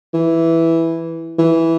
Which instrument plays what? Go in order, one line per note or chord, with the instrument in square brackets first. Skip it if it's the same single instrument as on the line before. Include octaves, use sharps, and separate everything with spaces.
[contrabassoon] E3
E3